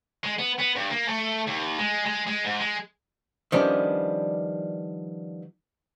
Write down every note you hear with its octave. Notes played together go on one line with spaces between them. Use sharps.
G#3
B3
B3
G2
A#3
A3
D#2
G#3
G#3
G#3
G#2
G#3
D#3 F3 G3 B3 C#4 D4